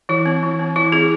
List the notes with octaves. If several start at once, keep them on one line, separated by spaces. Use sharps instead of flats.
E3 E4
C4
E3
C4
E3 E4
C4 E4 G#4